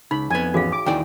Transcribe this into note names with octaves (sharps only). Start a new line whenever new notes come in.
C#2 D#4 B5
F2 B3 G#5
A1 F#4 G#4 F5
D6
D#2 E3 D#4 D5 G5